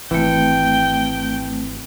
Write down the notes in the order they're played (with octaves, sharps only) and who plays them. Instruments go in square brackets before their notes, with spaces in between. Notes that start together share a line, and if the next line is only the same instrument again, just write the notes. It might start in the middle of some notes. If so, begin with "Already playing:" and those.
[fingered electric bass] G#1 [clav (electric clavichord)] E3 [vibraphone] A3 C4 [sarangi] G5